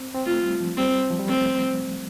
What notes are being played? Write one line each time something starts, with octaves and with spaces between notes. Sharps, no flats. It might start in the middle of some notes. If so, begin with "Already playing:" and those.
Already playing: C4
C4
A3 F4
G3
F3
G3 C4
F3
G3
A3 C4